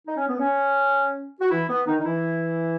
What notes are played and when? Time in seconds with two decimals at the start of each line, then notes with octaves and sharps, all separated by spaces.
0.07 D#4
0.17 C#4
0.28 B3
0.39 C#4
1.41 F#4
1.51 E3 E4
1.70 B3
1.87 D#3 D#4
2.00 D#4
2.06 E3 E4